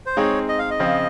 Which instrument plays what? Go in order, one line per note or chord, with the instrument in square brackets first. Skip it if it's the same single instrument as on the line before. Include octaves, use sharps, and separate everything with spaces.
[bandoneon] C5
[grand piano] G#3 C4 D#4 G#4 [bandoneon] C#5
[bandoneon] D#5
F5
D#5
[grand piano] C#3 F3 C4 F4